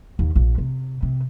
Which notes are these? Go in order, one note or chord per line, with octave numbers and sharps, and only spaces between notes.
D#2
A#1
C3
C3